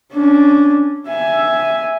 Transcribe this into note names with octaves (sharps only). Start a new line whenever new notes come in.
C#4 D4
E5 G#5